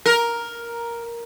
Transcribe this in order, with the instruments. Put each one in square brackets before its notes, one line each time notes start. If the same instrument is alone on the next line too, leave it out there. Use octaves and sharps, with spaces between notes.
[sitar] A#4